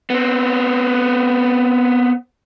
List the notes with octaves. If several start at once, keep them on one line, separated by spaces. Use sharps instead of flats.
B3 C4